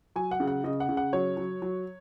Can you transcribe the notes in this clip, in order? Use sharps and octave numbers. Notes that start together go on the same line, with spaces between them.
F#3 G#5
F#5
C#3
F#5
C#3 D#5
F#5
C#3
F#5
F#3 C#5
F#3
F#3